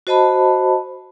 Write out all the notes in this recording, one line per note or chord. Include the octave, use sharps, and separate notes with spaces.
F#4 C5 D#5 A5 B5